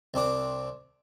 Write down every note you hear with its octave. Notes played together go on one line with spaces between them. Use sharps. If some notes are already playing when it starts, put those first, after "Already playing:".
C2 C4 D4 D6